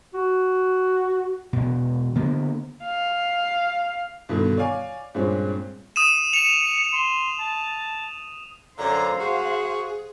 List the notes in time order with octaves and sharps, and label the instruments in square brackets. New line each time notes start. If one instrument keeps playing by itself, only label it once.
[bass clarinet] F#4
[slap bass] E1 B2
D3 A#3 B3
[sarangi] F5
[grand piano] G2 B2 D3 D#3
C#5 D5 F5 G#5 D6
G2 A#2 G#3 C4 C#4
[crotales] D#6 D#7 E7
[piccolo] C#7 [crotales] F7
[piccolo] C6
A5
[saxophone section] F#2 D3 [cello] C5 F5 [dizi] A#5
[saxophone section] F#4 [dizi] G#4